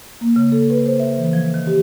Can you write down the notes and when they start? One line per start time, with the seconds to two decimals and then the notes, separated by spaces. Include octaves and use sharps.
0.21 A#3
0.36 C#3
0.52 A4
0.70 B4
0.86 C5
1.00 E5
1.18 E3
1.33 F3
1.54 D#3
1.67 G4